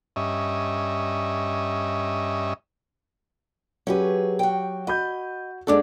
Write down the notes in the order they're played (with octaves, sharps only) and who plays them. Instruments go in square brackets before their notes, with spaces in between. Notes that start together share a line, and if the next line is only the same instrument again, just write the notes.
[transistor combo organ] G2 C#4 D#5 E5
[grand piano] F#3 G4 [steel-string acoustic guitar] C#4 G#4 B4
[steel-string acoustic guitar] F#4 G5
[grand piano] F#4 B5 G6 [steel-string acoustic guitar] D#5
[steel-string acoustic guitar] G#3 D4 F#4 [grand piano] A4 D6